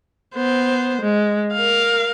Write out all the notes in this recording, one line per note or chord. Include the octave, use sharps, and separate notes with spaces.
B3 C5
G#3
A#4 F5